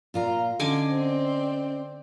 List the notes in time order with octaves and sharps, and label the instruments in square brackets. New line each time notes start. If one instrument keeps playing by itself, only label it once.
[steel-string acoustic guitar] A#2 F4 A#5
[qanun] D3 G#5 D6 [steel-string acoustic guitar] C#4 D#5
[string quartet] C4 D5